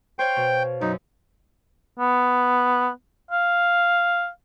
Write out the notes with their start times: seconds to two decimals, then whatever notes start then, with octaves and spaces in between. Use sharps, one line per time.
0.19 C5 C#5 F5 G5
0.36 B2
0.81 F#2 D#4
1.98 B3
3.31 F5